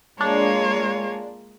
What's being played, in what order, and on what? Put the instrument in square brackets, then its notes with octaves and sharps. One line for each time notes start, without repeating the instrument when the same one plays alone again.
[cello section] G#3 [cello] A#3 F4 [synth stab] D4 [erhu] C#5